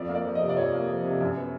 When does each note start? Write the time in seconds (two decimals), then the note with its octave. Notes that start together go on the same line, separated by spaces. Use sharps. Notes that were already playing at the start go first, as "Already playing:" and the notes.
Already playing: F2 D5
0.09 A#3
0.15 D5
0.25 F3
0.35 D#5
0.41 C3
0.49 D5
0.57 F2 C#5
0.73 A#3
0.89 F3
1.05 C3
1.21 F#2
1.36 B3